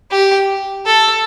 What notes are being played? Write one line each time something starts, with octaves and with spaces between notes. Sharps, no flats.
G4
A4